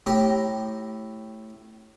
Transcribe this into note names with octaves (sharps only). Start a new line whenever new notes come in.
A2 G4 A#5 D6